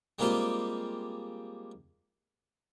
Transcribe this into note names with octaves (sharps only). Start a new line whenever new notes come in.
G3 G#3 A#3 C4 F4 G4